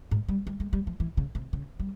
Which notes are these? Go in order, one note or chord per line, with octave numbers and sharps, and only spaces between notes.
G#2
G3
G3
G#3
G3
F3
E3
C#3
C3
C#3
G3